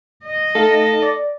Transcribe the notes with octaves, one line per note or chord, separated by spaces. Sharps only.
D#5
A3 D#4 A4 F5
D5